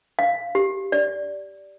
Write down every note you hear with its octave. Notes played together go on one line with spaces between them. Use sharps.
F5
G4
D5